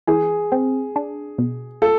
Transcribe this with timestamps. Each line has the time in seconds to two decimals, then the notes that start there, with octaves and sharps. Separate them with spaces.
0.07 E3 G#4
0.52 C4
0.96 D4
1.38 B2
1.82 F4 A4